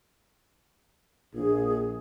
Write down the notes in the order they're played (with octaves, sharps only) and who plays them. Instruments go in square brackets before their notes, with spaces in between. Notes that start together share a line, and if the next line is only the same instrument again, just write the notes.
[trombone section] A#1 [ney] G#4